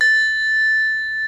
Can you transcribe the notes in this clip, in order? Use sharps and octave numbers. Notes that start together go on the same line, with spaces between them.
A6